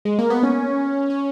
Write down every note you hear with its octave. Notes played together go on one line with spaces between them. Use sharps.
G#3
A#3
B3
C#4
C#4